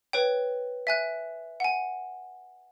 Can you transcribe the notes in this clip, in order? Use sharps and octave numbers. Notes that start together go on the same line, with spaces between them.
B4 C#5 G5
E5 G#5 F#6
F#5 G#5